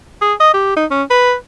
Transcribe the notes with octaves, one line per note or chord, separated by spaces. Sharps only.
G#4
D#5
G4
D#4
C#4
B4